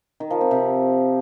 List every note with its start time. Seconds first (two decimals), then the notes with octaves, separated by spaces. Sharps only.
0.20 D#3
0.31 F3
0.41 C4
0.51 C3